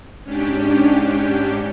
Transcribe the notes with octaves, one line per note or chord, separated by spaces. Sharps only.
G#2 C#4 D4 G4